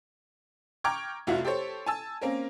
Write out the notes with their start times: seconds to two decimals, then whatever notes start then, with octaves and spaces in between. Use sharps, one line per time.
0.84 G5 A#5 C#6 D6 F6 G#6
1.27 F1 C2 F4 F#4 E5
1.44 G4 A4 C5 C#5
1.86 G#5 A5 E6
2.21 A#3 C4 C#4 A#4